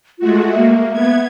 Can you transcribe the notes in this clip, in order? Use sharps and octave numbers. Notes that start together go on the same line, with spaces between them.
G#3 A3 F4 F#4
A#3 E5
B3 G#6